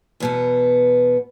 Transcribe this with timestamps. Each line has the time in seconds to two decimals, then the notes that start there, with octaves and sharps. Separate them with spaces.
0.20 E2 B2 B3